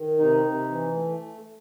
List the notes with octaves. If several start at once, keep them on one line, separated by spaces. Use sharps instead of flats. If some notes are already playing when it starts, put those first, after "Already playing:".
Already playing: D#3
C3 D#4
C3
E3
A3